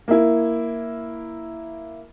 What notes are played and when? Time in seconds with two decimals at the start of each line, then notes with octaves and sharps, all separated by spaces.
0.08 A#3 E4